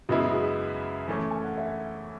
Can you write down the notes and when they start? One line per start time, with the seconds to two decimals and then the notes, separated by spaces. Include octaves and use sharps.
0.09 F#2 C#3 G#3 B3 E4 F#4
0.28 F#4
0.33 G#4
1.08 E3 A3 C#4
1.31 G#5
1.44 F#5
1.58 E5